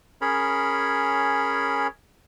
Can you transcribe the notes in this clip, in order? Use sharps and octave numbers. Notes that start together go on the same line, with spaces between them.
C#4 G#4 A#4 C#5 B5